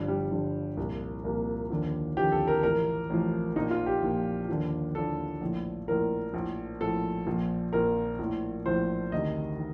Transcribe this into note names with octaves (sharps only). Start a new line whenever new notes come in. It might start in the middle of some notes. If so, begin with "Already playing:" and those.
Already playing: G1 G2 D3 F3
G3
G1 G2 D3 F3
C2 A#2 F3
C2 A#2 F3 A#3
D#2 D3 F3
D#2 D3 F3 G4
A4
A#4
A1 A2 F3 A#4
A1 A2 F3
A#1 A#2 F3 D#4
F4
G4
A#1 A#2 F3
D#2 D3 F3
D#2 D3 F3 A4
A#1 A2 F3
A#1 A2 F3 A#4
A#1 A2 F3
A#1 A2 F3 A4
A#1 A#2 F3
A#1 A#2 F3 A#4
A#1 A2 F3
A#1 A2 F3 C5
D2 C3 D#3 D#5
D#3